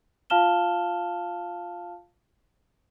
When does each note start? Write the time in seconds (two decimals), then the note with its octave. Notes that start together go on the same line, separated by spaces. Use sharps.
0.30 F4 F5 A5 F6 E7 G7